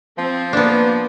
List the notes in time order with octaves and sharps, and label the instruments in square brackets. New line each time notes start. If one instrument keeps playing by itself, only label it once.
[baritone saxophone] F3 [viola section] C4
[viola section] A#3 [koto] B3 D4